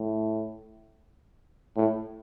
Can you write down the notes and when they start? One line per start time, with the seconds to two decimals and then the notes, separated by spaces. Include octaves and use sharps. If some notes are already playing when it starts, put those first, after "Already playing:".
Already playing: A2
1.76 A2